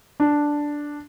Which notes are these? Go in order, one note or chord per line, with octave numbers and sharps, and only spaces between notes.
D4